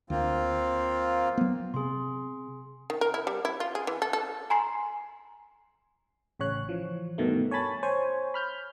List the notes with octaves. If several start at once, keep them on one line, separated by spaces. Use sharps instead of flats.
D2 A#3 C4 F4
F#3 B3
C3 G#4 C6
D#3
A#4
E4
G3
E4
F4
G#4
E3
A4
A4
G#5 A#5 C6 C7
A1 C#3 C#5 F#6
E3 F3
G2 B2 D#3 A3
C#5 G#5 A5 B5 A6
C5 C#5 G#5
B5 F6 G6